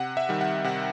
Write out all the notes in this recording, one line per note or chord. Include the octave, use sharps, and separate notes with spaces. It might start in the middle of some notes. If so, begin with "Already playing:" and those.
Already playing: C3 F#5
E5
D#3 G3
F#5
C3 F#5